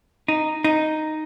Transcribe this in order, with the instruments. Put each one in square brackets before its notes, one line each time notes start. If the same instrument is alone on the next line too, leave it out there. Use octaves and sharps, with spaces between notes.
[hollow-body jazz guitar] D#4
D#4